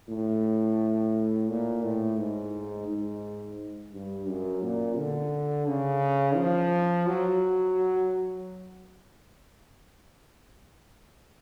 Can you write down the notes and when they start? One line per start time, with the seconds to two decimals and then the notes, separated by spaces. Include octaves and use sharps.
0.08 A2
1.49 A#2
1.83 A2
2.18 G#2
2.88 G#2
3.93 G2
4.27 F#2
4.63 A#2
4.98 D3
5.68 C#3
6.36 F3
7.07 F#3